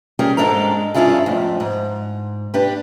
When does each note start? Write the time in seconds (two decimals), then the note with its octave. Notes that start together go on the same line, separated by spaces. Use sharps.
0.19 G3 C#4 G4 G#4 A#4
0.37 G#2 G#3 D4 A4 A#4 A#5
0.94 G2 C#4 D4 E4 F4 G#4
1.26 F2 A2
1.60 G#2
2.54 D4 G4 B4